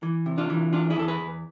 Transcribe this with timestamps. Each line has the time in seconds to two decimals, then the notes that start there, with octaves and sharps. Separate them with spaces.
0.03 E3
0.26 C3
0.38 D4 F4
0.50 E3
0.73 E2 D4 F4
0.90 E4 G#4
0.96 E2 A4
1.08 G#4 B4
1.20 E2